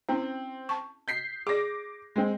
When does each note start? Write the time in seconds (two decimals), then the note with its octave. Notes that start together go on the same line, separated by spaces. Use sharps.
0.09 C4 C#4 E4
0.69 A5 C#6
1.08 G6 B6 C7
1.47 G#4 D5 D6 A#6
2.16 G#3 C4